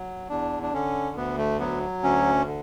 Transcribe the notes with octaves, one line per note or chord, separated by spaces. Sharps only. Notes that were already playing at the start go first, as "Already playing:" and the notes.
Already playing: F#3
E2 D4
D4
D3 C#4
D2 B3
A3
F#3 B3
D2 C#4
D3